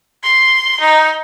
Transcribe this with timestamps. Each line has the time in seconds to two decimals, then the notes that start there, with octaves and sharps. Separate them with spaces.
0.24 C6
0.80 D#4